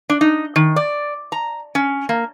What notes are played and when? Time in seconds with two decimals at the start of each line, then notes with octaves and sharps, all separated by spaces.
0.10 D4
0.21 D#4
0.56 D#3
0.76 D5
1.32 A#5
1.75 C#4
2.09 A#3